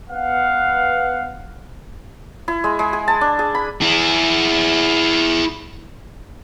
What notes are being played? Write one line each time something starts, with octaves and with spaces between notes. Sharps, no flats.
B3 F5 F#5
E4
G#3
G#3
G#4
A5
D4
G#4
B5
E4 G#4